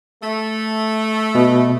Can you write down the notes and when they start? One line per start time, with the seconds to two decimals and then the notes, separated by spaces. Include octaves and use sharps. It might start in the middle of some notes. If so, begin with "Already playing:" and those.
0.22 A3
1.35 B2